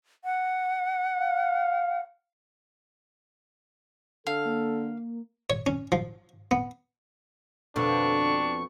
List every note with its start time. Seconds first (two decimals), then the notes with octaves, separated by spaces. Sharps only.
0.24 F#5
1.19 F5
4.27 D3 A4 F5
4.45 A#3
5.50 C#5
5.66 C#4
5.92 F3
6.51 B3
7.76 F2 B2 D3 F3 D4 C#6